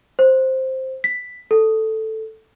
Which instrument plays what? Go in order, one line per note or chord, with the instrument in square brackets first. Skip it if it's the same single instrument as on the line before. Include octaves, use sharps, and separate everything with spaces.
[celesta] C5
B6
A4